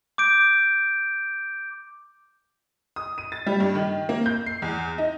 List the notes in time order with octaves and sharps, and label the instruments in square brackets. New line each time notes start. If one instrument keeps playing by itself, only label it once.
[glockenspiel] D6 G6 D7
[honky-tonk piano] D#6
D#7
A6
G3
G2
D#3
A#3
G6
C7
E2
D#4